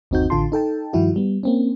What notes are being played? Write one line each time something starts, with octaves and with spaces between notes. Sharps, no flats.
G1 D#2 C4 D#4 F#4 G6
A1 D3 F4 A5 C6
D#4 A4 G5 A5
G2 D#3 F3 E4 F#4
G3 B3
A#3 C4 C#4